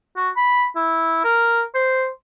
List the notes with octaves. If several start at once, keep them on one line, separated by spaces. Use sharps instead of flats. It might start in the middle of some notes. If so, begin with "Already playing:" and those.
F#4
B5
E4
A#4
C5